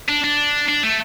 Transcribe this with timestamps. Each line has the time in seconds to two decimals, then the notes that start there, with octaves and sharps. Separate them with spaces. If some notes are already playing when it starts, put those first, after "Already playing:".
0.09 D4
0.24 D4
0.68 D4
0.83 A3